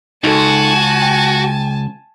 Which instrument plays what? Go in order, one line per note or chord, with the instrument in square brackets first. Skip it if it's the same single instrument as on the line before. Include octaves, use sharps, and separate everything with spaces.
[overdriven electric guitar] C#2 [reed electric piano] D#4 A4 [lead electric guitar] F#4 [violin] G#5 A5
[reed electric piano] G5